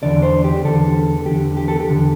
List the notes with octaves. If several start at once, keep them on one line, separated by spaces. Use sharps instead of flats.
E2 D3 D5
C5
G4
E2 D3 A4
E2 D3 G4
G4
A4
G4
E2 D3